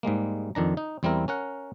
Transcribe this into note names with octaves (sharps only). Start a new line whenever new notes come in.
G#2 G3 G#3 A#3
F2 D#3 D4 A#5
D#4
E2 G3 C4 E4 A#4
C#4 A#4 F#5